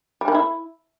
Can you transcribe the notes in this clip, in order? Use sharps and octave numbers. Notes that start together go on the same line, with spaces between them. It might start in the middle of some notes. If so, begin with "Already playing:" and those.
G3
D#3
E4